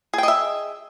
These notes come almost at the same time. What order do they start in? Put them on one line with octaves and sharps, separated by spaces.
G#4 G5 D#5 E5